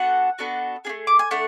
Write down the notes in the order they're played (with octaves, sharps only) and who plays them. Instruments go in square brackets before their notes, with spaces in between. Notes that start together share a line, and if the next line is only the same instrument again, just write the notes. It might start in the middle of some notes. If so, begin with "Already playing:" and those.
Already playing: [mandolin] B3 D4 F#4 A4 F#5
B3 D4 F#4 A4
D4 G#4
A3
D6
G#5
A3 D4 F#5